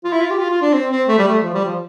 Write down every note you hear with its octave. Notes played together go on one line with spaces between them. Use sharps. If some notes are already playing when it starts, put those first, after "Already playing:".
F4
E4
F4
G4
F4
F4
D4
C4
C4
A3
G3
A3
F3
G3
F3